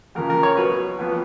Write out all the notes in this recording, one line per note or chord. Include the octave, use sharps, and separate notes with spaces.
F2 C#3 F3 A#4
A#4
C#5
B2 F#3 B3 B4
F2 F3 B3